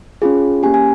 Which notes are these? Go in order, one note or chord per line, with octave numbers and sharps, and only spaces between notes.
C#4 F4 G#4
A#3 C#4 G4 G#5
G#5